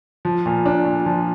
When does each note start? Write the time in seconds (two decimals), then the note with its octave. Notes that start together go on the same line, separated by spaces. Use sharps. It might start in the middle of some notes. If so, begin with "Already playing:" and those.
0.25 F3
0.46 A#2
0.66 D4
0.85 A#2
1.06 F3